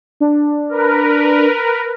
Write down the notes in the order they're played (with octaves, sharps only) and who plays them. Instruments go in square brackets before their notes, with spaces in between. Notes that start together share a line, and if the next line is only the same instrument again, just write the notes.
[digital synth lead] D4
[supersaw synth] A#4 B4